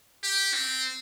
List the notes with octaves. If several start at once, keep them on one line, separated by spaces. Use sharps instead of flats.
G4
C4